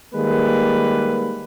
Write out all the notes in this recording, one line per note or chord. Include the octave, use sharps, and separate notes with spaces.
D#3 G3 G#3 A#3 B4